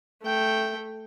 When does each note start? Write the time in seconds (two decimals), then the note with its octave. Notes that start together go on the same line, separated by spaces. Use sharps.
0.23 A3 G5